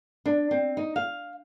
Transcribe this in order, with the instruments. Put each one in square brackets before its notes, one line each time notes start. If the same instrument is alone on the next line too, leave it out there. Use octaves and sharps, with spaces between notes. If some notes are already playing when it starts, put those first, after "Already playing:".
[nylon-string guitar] D4
C4
D#4
F5